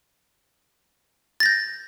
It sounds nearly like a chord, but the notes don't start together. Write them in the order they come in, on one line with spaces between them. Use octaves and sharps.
A6 A#6 G6